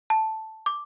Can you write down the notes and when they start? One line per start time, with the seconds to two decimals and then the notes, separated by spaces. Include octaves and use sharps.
0.10 A5
0.66 D6